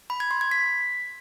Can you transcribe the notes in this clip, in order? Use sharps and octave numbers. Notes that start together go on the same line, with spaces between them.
B5
G#6
C6
G#6
B6